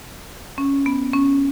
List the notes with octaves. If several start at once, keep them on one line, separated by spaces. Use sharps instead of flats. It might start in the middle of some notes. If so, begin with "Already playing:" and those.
C#4
B3
C#4